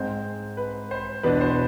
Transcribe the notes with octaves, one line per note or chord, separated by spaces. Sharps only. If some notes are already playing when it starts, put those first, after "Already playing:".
Already playing: G#2 G#3 C4 C5
B4
C5
E2 B2 B3 D4 B4
C5